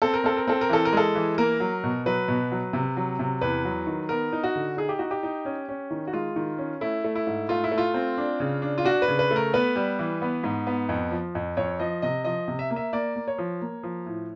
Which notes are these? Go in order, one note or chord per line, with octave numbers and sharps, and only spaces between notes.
C4 A4
A#4
C4 A4
A#4
C4 A4
A#4
E3 A4
A#4
G#3 A4
E3
A#3 A#4
F#3
B2
F#3 B4
B2
F#3
C3
F#3
C3
E2 B4
F#3
D#3
B3 A#4
D#4
F#4
D3
D#4 G#4
G4
D#4 F#4
G4
D#4
C#4
C#4
D#3
F#4
G#3 F4
D#3
C#4
A3 E4
A3
E4
G#2
A3 F4
E4
A3
F4
C4
D4
C#3
D4
F4
D4 F#4
B4
C#3
B4
A3
A#4
B3 B4
G3
E3
B3
G#2
B3
F2
F3
F2
F2 C#5
F3 D#5
C3 D#5
F3 D#5
C3
E5
A#3
E5
A#3 D5
A#3
C#5
F3
A#3
F3
A2